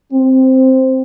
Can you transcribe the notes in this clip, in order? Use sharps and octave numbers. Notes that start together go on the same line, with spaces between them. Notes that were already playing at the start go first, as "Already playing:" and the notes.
C4